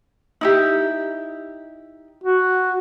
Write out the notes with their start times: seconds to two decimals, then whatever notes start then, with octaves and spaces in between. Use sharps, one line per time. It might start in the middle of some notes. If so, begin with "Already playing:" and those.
0.41 D#4 E4 G4
2.24 F#4